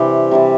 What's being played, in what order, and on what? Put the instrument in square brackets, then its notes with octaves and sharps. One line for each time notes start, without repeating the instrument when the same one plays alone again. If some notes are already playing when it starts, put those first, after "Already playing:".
Already playing: [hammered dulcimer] C3 E3 G3 G4
C3 E3 G3